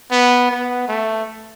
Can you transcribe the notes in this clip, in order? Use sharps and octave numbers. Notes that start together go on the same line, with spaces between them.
B3
B3
A3